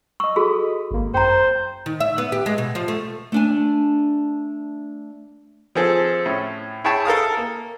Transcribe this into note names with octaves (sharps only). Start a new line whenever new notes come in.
D#5 C#6 E6
F#4 G#4 A4 B5 D#6
G#1 A#3
F#2 C5 G5 A#5
D#3
E5
B3
G4
G#3
B2
F3
A3
A3 D4 G#5
F3 C4 G#4 A4
A2 C#4
E4 G#4 C#5 G5 A5 B5
A4 A#4 F5 D#6
A#3